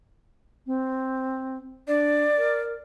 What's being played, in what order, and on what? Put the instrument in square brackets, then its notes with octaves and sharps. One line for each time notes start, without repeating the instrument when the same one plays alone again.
[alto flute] C4
[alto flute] D4 [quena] D5
[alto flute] A#4